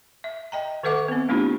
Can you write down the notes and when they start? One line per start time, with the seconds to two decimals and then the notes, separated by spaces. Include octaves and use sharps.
0.24 E5
0.52 D#5 G5 A#5
0.83 D#3 A4 B4 E5 F#5 D6
1.08 B3 C4
1.29 A3 B3 D4 E4 F4 G4